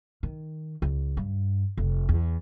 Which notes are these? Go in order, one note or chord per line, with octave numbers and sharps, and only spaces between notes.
D#3
C#2
G2
F1
E2